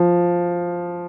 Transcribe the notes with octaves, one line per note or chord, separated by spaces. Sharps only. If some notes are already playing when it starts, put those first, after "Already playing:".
Already playing: F3